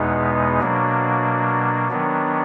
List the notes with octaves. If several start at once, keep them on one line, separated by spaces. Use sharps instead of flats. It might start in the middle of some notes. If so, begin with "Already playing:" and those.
Already playing: E2 B2 G#3 B3 D#4
B2 F#3 A#3 D4
D#3 F#3 B3 D4